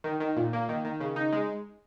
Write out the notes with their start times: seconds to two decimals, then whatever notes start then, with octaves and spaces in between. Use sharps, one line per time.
0.04 D#3
0.20 D#3
0.37 A#2
0.53 A#3
0.69 D#3
0.85 D#3
1.00 C#3
1.16 D#4
1.32 G#3